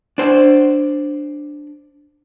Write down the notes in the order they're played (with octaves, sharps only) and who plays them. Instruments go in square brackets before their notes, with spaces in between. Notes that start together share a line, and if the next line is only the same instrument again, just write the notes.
[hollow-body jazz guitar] D4 C5